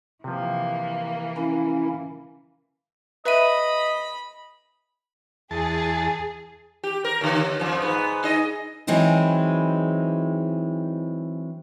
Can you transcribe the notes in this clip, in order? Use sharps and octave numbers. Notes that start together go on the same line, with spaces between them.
C3 E3 F3 A#3
C#4 E4
B4 D#5 E5 B5 D#7
E2 G#4 A5
G4
A#4
D#2 D3
F2 F3
G#2 B3
D#4 G#4 D#5
E3 F#3 G#3 C4 D#4 E4